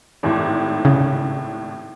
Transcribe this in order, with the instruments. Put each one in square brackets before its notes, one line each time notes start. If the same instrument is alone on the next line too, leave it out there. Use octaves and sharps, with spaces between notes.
[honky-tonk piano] G#1 D#2 A2
[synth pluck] C#3